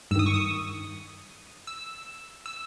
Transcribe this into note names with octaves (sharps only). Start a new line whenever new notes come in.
G2 D#3 D#6 E6
C#6
D#6
E6
E6